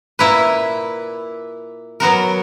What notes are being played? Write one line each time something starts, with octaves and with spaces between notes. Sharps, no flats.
A#2 A#3 E4 B4
F#3 B3 F#4 A#4